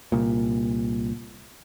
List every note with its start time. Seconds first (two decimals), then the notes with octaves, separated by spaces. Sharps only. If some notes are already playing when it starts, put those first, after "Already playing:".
0.12 C2 A#2